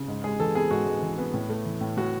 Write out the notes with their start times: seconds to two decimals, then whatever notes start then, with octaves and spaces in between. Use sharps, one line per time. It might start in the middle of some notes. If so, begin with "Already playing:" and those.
Already playing: C#3
0.08 G#2
0.24 G#3 G#4
0.40 E3 A4
0.55 B3 G#4
0.71 G#2 F#4
0.86 G#3
1.02 E3
1.18 B3
1.34 A2
1.49 A3
1.65 E3
1.81 A2
1.97 A2 F#4